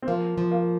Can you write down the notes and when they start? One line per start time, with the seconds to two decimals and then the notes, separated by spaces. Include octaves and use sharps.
0.02 C4
0.07 F3 A#3
0.38 F3
0.51 A#3